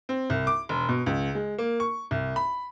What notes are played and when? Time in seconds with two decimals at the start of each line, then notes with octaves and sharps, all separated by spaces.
0.09 C4
0.30 C2
0.47 D6
0.69 E1
0.89 B2
1.06 C#2
1.35 G#3
1.58 A#3
1.80 C#6
2.11 C2
2.36 B5